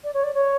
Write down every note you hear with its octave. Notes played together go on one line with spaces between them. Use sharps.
D5
C#5
D5
C#5